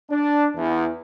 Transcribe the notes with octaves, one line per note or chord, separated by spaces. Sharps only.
D4
E2